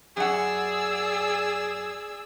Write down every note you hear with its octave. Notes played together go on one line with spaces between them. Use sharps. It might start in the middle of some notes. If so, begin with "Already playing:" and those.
F#2 G#4 D5 F#5 E6